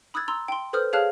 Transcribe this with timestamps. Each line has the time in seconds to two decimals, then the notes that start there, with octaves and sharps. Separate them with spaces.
0.14 B5 D#6 E6 F#6 G#6 A6
0.28 A#5 C6 E6
0.48 G5 C6
0.73 A4 B4 C5 D#6 F6 G6
0.93 G#4 C#5 F5 A5 F6 F#6